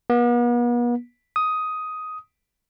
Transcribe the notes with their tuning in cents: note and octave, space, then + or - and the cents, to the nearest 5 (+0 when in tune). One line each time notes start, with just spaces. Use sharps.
B3 -45
D#6 +10